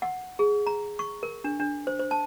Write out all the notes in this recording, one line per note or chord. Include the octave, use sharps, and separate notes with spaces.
F#5
G#4
A#5
C#6
A#4
D4
D4
C5
C5
A5